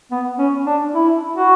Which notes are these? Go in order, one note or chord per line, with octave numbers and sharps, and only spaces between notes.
B3
C#4
D4
E4
F#4